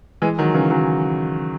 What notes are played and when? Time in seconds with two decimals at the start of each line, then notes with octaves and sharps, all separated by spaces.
0.22 E3 G#3
0.38 D#3 F#3
0.54 C#3 E3
0.70 D#3 F#3